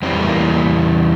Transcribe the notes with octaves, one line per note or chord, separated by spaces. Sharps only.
E2 E3 G3 C4
A3
A#3